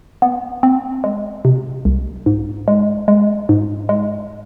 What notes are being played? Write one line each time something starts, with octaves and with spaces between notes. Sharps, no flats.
B3
C4
G#3
C3
C2
G#2
G#3
G#3
G#2
G#3